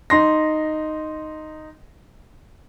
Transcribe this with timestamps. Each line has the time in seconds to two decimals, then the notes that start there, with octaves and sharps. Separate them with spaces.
0.10 D#4 C6 A#6